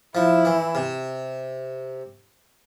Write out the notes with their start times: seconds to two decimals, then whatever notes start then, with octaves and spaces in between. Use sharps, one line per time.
0.15 F3 E4
0.45 E3
0.75 C3